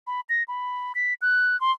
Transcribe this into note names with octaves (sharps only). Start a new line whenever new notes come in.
B5
A#6
B5
B6
F#6
C6